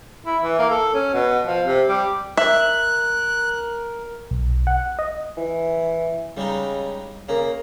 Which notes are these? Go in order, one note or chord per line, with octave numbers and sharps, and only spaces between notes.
E4
E3
A#3
A4
C#4
B2
F3
C3
G3
A#4 E5 F#6
B1
F#5
D#5
E3
C#3 G3 G#3 D#4
C#3 A#3